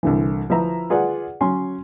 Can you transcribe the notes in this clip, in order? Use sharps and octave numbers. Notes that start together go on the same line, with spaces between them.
C2 D3 E3
F3 E4 B4 E5 A#5
F4 G#4 B4 D5 F#5
F#3 C#4 G#5 C6